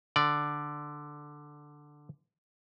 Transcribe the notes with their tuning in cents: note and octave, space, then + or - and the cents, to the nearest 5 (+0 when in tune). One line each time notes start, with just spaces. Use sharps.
D3 +5 D5 +0